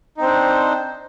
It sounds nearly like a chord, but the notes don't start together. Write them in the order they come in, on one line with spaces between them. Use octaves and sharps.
D#4 C4 C5 D4